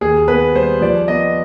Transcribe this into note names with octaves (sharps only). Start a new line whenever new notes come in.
D#2 G#4
B3 B4
G3 C5
F3 D5
B3 D#5